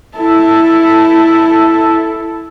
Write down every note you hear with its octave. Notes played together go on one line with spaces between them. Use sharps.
E4 A4